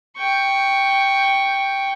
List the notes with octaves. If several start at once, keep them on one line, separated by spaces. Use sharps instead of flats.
G5 C#6